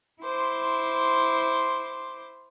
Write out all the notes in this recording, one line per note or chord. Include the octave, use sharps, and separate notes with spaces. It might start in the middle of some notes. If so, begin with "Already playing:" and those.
E4 C5 C6 D6